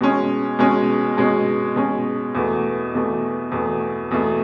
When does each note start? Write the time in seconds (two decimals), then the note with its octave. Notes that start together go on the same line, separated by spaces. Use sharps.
0.01 B2 G#3 C#4
0.59 B2 G#3 C#4
1.17 B2 G#3 C#4
1.76 B2 G#3 C#4
2.35 E2 B2 A3
2.94 E2 B2 A3
3.52 E2 B2 A3
4.11 E2 B2 A3